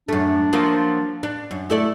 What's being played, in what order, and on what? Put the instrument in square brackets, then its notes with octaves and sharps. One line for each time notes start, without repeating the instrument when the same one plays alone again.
[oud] F#2 A3 [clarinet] D4
[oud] F3 F#3 A#3
D4
F#2
[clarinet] A3 [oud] E4 A4 D5